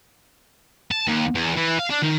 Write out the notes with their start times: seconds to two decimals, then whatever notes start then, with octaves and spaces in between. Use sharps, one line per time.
0.91 A5
1.08 D#2
1.35 E2
1.57 E3
1.79 F5
1.90 D4
2.03 D#3